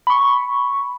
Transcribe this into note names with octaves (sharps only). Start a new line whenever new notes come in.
B5 C#6